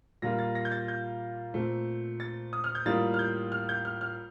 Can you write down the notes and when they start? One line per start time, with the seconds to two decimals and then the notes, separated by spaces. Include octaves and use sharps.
0.22 A#2 G3 A#3 F4 A#6
0.39 A6
0.55 A#6
0.65 G6
0.72 A6
0.88 G6
1.54 A#2 A3 C4
2.20 A6
2.53 D#6
2.64 F6
2.75 G6
2.86 A2 G3 A#3 F4 A6
3.14 F6
3.19 G6
3.52 F6
3.69 G6
3.85 F6
4.01 F6